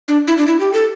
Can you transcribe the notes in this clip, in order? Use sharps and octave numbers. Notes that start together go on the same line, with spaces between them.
D4
E4
D4
E4
G4
A4